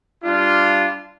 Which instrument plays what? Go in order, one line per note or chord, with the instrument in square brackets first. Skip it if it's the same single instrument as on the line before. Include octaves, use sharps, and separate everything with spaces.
[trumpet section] G3 D4 F4